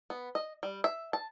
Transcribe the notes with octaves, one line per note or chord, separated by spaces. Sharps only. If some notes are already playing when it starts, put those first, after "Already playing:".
B3
D#5
G3
E5
A5